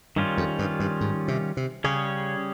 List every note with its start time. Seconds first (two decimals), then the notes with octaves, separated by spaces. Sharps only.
0.16 G2 D#3 G3 C#4 F4
0.37 F2
0.59 G2
0.80 G2
1.01 G#2
1.28 C3
1.57 C3
1.84 C#3 G3 C#4 G#4 C#5